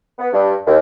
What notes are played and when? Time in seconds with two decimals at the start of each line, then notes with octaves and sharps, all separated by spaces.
0.19 B3
0.33 G2
0.66 D#2